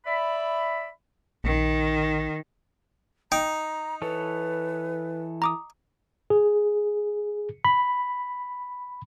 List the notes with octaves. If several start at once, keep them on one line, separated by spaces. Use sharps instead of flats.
D5 E5 B5
A#1 D#3
D#4 G5 A#5
E3 A4 B4 C#5
A#5 D6 D#6
G#4
B5